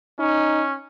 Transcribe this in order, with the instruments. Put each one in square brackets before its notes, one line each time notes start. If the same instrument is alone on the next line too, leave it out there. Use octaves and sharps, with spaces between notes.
[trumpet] C#4 [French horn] D#4